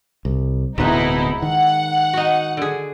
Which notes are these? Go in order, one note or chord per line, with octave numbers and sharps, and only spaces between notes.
C2
D1 G#2 B2 D#4 E4 B4
D#3 F#5
D#4 F#4
D3 G#4